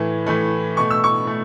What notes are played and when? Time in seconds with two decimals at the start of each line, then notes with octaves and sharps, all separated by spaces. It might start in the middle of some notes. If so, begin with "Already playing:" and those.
Already playing: A2 E3 A3
0.27 A2 E3 A3
0.77 B2 A3 C#6
0.91 E6
1.04 C#6
1.27 A3